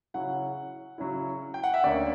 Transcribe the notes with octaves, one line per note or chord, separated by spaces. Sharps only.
C#3 F#3 C#4 E4 F#5
C#3 F#3 C#4 E4
G5
F#5
E5
D2 D3 A#3 C#4 D5